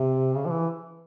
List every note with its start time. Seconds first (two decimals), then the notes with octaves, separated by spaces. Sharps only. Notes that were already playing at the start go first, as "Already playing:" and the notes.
Already playing: C3
0.35 C#3
0.45 F3
0.51 E3